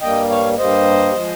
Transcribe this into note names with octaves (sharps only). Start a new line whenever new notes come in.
G2 G3 A#3 D#5 G5
C#5 F5
G2 G3 A#3 C5 D#5
F3 G#3